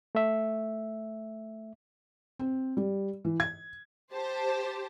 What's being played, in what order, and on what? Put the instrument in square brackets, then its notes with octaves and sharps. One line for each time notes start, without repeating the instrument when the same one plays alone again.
[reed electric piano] A3 E5
[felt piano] C4
G3
E3
G#6
[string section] G4 C5 A5